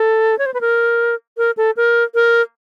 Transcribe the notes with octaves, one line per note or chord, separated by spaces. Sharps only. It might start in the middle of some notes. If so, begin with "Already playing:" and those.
Already playing: A4
C#5
C5
B4
A#4
A#4
A4
A#4
A#4